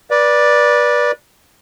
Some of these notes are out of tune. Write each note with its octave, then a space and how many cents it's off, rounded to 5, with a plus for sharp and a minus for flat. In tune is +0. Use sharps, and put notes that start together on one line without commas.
B4 -30 D5 +0